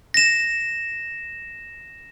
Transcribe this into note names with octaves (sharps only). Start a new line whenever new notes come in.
A#6 E7